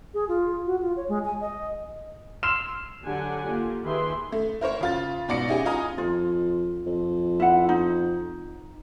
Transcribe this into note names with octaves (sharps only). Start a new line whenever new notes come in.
G#4
F4
F#4
F4
C#5
G#3
G#5
D#5
C6 E6 F6 E7
D3 F#3 D4 G4 F#5 G#5
A#3 F4 G4
D#3 G4 G#4 B4 E5 C6
A3
E4 A#4 C5 C#5
C#3 F4 A6
G#2 B2 D5 A#6 C#7
C#4 D#4 E4 G4 G#4
F4 D#5 G#5 A#5 D#6
F2 F4
F2
E4 F#5
D#4